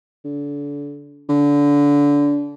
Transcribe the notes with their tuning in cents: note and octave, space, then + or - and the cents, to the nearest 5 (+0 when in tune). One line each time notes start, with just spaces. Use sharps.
D3 -30
D3 -25